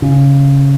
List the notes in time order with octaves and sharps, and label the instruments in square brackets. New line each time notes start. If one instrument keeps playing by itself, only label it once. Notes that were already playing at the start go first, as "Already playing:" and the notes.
[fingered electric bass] C#3